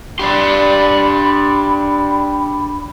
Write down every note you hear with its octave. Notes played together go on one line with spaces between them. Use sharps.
D4 G4 D5 B5 C6